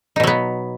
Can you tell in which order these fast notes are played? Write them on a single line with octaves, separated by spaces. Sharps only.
D#4 B2 F#3 B3